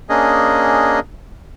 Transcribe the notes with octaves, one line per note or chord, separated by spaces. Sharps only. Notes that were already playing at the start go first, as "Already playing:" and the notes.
A#3 C#4 D4 G#4 D#5